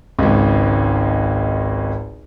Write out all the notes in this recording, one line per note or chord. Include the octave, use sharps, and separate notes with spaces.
G#1 C#2